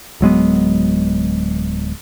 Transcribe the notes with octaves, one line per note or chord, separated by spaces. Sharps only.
D1 F#3 G#3 B3